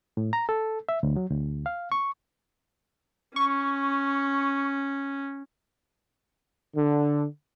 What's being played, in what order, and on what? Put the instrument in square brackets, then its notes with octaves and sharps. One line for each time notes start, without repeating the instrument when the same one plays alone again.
[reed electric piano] A2
A#5
A4
E5
D2
F#3
D2
F5
C#6
[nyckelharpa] C#4 [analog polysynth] C#6
[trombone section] D3